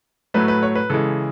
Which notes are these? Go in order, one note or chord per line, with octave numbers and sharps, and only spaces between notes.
A2 F#3 A3 B4
B4
C#5
B4
C#3 E3 G#3 A4